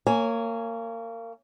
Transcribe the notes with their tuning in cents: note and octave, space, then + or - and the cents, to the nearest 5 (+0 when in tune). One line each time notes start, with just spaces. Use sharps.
A#3 -25 C#5 +0 G#5 +0